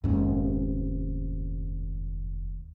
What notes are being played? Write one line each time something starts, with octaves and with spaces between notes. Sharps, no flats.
F1 D#2 G#2 G#3 C#4